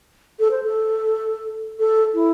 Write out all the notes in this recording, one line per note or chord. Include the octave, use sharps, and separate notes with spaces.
A4
C5
A4
A4
E4